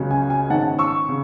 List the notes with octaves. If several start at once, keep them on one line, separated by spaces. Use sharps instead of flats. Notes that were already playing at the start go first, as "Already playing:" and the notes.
Already playing: C#2 C#3 F#3 C#4
G#5
G#5
G#2 D#3 G#3 C#4 F#5 A5
C#6 E6
C#3